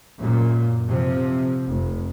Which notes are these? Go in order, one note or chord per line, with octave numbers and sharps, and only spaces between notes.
F#2 A#2
C3 F3
F1